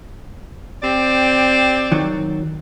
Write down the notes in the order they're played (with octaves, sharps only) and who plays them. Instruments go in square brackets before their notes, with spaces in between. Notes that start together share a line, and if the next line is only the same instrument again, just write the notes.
[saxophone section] C4 G4 D5
[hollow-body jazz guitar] D#3 F#3